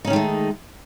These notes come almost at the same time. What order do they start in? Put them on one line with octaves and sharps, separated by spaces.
D#4 C#4 D#3 G#3 A3